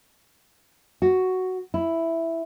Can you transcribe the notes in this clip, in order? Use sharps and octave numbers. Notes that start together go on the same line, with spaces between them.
F#4
E4